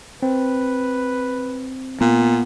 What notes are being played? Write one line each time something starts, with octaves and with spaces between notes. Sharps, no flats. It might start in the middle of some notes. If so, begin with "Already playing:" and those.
C4 B4
A#2 B3